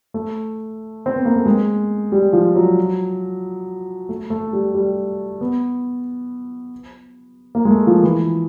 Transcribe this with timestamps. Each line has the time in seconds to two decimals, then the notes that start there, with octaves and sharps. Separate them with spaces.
0.14 A3
1.06 C4
1.16 B3
1.25 A#3
1.36 A3
1.46 G#3
2.12 G3
2.33 F3
2.56 F#3
4.09 A3
4.30 A3
4.53 G3
4.74 G3
5.41 B3
7.55 A#3
7.65 G#3
7.71 A3
7.87 F3
8.03 E3